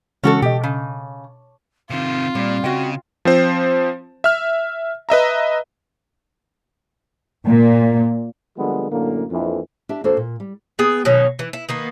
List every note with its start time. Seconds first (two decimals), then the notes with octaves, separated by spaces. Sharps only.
0.24 C#3 E3 G#3 C#4 F#4 A4
0.42 B2 G4 D#5
0.63 C#3
1.90 C3 D#3 C4 F4
2.35 A#2 G3
2.64 C#3 F#4 D#5 G5
3.25 F3 C4 C5
4.24 E5 F6
5.09 B4 D#5 E5 A#5
7.47 A#2
8.57 D3 F3 G3 G#3 A#3 B3
8.91 F#2 A2 D3 A#3
9.31 A#1 F2 E3
9.89 D4 G4 E5
10.04 D#2 A#3 D4 F#4 A4 C5
10.17 A#2
10.40 G3
10.79 B3 G#4 G5
11.05 B2 D#3 F#3 C#4
11.39 E3
11.53 E4
11.69 D#3 A#3 B3